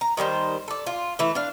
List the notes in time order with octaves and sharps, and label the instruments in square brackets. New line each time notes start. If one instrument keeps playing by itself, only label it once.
[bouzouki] A#5
D#3 G3 G4 C5
A4 D5
F4
E3 A3
D4 F5